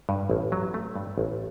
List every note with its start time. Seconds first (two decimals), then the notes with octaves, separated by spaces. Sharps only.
0.09 G2
0.30 A1
0.52 F#3
0.74 A3
0.96 G2
1.18 A1